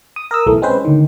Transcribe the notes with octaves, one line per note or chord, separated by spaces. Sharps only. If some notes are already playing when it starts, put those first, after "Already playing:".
D#6
A#4 D#6 E6
B1 A2 E3 A3
G#3 C4 C#4 B4 C5
D2 D#3